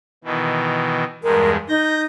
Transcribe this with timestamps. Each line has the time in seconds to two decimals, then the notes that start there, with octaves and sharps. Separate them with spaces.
0.24 B2 D#3 E3
1.23 E2 G2 G#3 A#4
1.69 D#4 G6 A#6